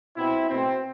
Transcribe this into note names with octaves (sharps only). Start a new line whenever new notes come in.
B2 B3 C4 E4
B2 A3 C4